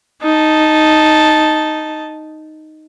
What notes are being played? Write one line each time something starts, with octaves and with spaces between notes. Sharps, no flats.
D#4 A5